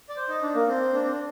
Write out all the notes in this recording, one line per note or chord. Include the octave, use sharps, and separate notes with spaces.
D5
C5
D#4
D4
A#3
C4
D4
C4
D4